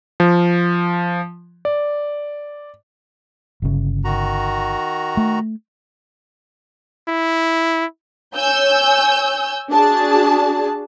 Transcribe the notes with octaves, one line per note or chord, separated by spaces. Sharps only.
F3
D5
G1 C#3
D#3 F#4 A#5
A3
E4
C#5 G#5 E6 G6
D4 F#4 G#4 A5